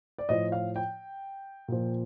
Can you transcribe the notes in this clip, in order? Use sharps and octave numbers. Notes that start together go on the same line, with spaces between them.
D5
A2 F3 D#5
F5
G5
A#2 F3